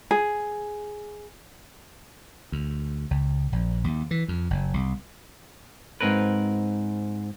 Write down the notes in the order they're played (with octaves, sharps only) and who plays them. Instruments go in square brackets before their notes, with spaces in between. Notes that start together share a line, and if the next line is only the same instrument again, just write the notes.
[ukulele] G#4
[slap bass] D2
C#2
A#1
D#2
E3
F2
F#1
C2
[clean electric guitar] G#2 C3 C4 A#4 B4